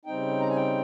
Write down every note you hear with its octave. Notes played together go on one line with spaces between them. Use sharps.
C#3 G3 C4 D#4 G5
A#5
G#5
G5